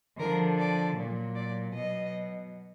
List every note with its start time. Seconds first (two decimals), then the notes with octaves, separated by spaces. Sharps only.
0.18 D3 F3 A#4
0.58 D5
0.96 A#2 F#3
1.35 D5
1.74 B2 F#3 D#5